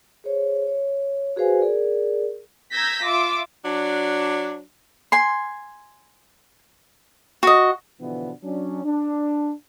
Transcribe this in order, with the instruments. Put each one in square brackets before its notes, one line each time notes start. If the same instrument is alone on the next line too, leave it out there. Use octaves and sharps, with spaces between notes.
[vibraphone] G#4 C5 C#5
C#5
F#4 G#4 B4 C5 F5 G#5
G#4 A#4 D5
[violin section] A#5 E6 G6 G#6 A#6 B6
F4 E5 D6 E6
[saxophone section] F#3 D4
[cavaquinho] G#5 C6
F#4 D#5
[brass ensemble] B2 D3 E3 F3 B3 D4
F#3 C#4 D4
D4